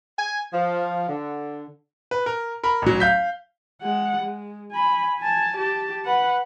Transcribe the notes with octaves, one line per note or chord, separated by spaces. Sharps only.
G#5
F3
D3
B4
A#4
A#4 B5
A1 F#3
F5 G6 B6
G#3 F#5
G#3
G#5 B5
G#5 A5
G4 A5
B4 F#5